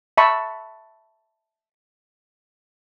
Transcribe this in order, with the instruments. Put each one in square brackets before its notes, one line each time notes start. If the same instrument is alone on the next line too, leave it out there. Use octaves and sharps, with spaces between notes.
[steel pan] E5 A5 B5 C#6